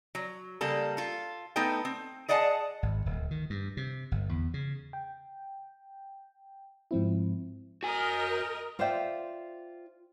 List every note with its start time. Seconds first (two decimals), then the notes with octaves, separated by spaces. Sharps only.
0.15 F#3
0.61 C#3 G3 A#3 A4
0.97 F4 A4
1.56 A3 B3 D#4 A4 G5
1.85 C4
2.29 G#4 D5 D#5 F#5 G#5 A5
2.83 G#1
3.06 D1
3.31 D#3
3.50 G2
3.77 C3
4.12 G1
4.29 E2
4.54 C#3
4.93 G5
6.91 G#2 F3 C4 E4
7.83 F#4 A#4 D#5 G#5
8.79 F4 C5 D5 E5 G5